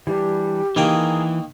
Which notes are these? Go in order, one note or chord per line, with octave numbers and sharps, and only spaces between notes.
E3 G3 D4 G4
D#3 E3 A#3 G#4 A#4 G5